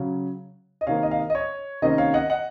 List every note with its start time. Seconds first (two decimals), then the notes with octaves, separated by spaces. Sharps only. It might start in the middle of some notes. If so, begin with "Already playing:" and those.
Already playing: C#3 F#3 C#4
0.81 D#5
0.87 C3 D#3 A#3 C#5 F5
1.03 D#5
1.11 F5
1.19 D#5
1.30 D#5
1.35 C#5
1.82 C3 D#3 A#3 C#4 D#5
1.98 C#5 F5
2.14 D#5 F#5
2.30 D#5 F#5